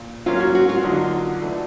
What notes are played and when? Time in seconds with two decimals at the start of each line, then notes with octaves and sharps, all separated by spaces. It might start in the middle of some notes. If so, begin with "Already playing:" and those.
Already playing: A#2
0.26 F#3 A#3 C#4 F4
0.40 F#4
0.55 F#4
0.69 F4
0.84 D3 F#3 A#3 D#4
1.41 E3 A3 D4